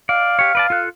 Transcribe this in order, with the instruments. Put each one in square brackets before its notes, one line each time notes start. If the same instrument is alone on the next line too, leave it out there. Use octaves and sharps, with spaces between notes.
[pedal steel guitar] D5 [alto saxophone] F5
[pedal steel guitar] G4 C#5
B4 D5 A5
F4 A4 F#6